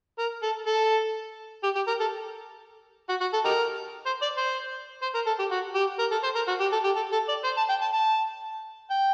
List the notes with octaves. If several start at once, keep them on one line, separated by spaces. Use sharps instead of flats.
A#4
A4
A4
G4
G4
A#4
A4
F#4
F#4
A4
D#4 G4 A#4
C5
D5
C5
C5
A#4
A4
G4
F#4
G4
A#4
A4
C5
A#4
F#4
G4
A4
G4
A4
A4
D5
C5
A5
G5
A5
A5
G5